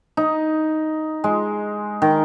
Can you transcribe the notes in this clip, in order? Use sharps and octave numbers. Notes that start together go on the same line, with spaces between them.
D#4
G#3
D#3